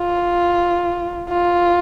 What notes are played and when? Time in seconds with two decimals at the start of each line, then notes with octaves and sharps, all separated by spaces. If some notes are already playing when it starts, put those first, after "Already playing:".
Already playing: F4
1.29 F4